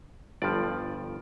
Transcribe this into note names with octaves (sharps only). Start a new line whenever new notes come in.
G1 G2 F3 D5